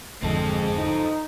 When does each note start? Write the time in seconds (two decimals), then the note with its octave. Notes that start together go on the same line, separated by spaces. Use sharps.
0.23 G#1 F2 D3 G#3 C4 A4
0.77 D#4